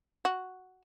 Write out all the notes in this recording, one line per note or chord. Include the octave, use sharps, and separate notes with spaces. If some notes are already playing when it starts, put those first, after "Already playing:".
F#4